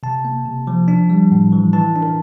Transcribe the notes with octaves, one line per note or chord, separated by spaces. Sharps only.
C3 A5
A#3
C3
F3
D4
G3
A2
E3
E3 A5
D4
A#4